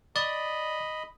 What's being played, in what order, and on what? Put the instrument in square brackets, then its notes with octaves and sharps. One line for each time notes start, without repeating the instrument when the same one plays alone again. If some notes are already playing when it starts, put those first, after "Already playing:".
[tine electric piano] D5 [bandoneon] D#5 B5